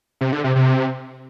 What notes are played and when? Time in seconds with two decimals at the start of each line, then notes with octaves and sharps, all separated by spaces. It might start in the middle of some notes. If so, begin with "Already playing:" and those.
0.21 C3
0.32 D3
0.44 C3
0.56 C3